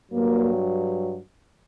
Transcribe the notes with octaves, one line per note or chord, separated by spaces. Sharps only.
G2 F#3 A#3